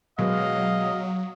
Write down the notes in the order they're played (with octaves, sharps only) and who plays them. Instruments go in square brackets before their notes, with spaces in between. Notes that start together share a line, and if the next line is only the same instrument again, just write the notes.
[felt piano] B2 G#3 B3 [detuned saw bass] F#3 [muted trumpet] D#5 [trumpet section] F5